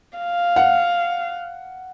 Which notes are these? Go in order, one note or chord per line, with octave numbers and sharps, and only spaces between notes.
F5
F#5